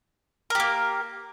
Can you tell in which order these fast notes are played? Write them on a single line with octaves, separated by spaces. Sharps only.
A#4 G4 A#3